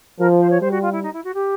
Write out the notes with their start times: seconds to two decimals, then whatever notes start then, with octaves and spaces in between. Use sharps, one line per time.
0.19 F3 A#4
0.40 C5
0.50 C#5
0.61 G3 C5
0.71 F#4
0.82 F4
0.92 E4
1.03 D#4
1.13 E4
1.24 F#4
1.34 G4